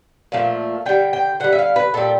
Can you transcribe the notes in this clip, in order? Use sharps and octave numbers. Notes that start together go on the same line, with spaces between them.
A#2 F3 A3
D3 G3 G5
G5
D3 G3 F#5
E5
F5
B4
A#2 G3 A4